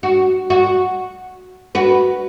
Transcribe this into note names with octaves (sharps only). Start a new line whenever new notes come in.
F#4
F#4
F#4 B4